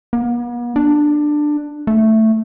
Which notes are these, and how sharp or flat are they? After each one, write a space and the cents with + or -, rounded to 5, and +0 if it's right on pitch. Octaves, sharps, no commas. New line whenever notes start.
B3 -45
D4 +15
A3 +5